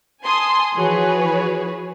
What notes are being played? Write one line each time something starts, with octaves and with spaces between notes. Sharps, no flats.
G#5 A5 C6 D#6
E3 F3 F#4 G#4 B4 C#5